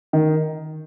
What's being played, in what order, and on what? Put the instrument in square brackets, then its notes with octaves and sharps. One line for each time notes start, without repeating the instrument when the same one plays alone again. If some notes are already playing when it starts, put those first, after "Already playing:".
[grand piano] D#3